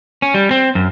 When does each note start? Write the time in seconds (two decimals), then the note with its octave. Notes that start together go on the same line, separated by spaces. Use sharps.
0.22 C#4
0.34 G3
0.51 C4
0.75 F#2